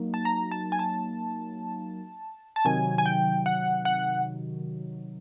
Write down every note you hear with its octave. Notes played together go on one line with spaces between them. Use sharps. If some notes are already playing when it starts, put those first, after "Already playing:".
Already playing: F#3 A#3 D#4
A5
A#5
A5
G#5
A5
A5
C3 D#3 F#3 G#5
G#5
G5
F#5
F#5